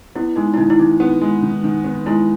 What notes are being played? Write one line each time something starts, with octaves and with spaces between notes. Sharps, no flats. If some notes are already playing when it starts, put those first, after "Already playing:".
B3 E4
G#3 D#4
E4
D#3 D#4
E4
D#3 D#4
B3
G#3
D#3
D#3
B3
G#3 E4